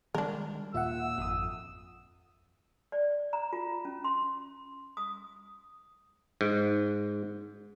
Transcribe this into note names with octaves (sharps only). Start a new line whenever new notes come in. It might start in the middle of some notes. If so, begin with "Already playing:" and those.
D#3 G3 G#3 D4 A#4
D#2 A#2 F4 E5 F#5 E6
G#1 F2 D#6
D5
A#5
F4
C#4
C6
D#6
G#2